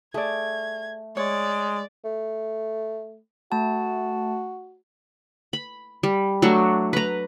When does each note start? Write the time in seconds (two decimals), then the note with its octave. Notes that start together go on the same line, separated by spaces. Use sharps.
0.14 A3 G#4 D5 G#6
1.17 G#3 C#5 D5
2.05 A3
3.52 A3 F#4 A5
5.53 B5
6.03 G3
6.42 F#3 A3 D4 F#4
6.93 B4 A#5